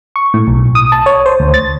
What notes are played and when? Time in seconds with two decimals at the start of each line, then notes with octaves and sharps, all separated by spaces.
0.16 C#6
0.34 A2
0.47 B1
0.75 D#6
0.92 A5
1.06 C#5
1.26 C5
1.40 D2
1.54 A6